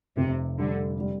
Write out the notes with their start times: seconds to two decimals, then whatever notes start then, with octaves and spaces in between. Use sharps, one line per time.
0.17 F1 C3
0.59 D3 G3
1.01 G3